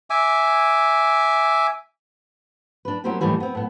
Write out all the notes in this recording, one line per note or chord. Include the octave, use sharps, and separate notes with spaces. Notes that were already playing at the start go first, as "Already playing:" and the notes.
E5 G#5 D6
D4 B4
F#3 A#3 C4 C#4 E4 G4
D#2 A2 D#3 E3 G3 C#4
B3 C4
A2 B3